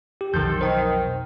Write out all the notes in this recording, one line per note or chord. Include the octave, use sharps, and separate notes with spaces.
G4
B1 F2 D#3 C4 A4 G6
D#3 C5 G5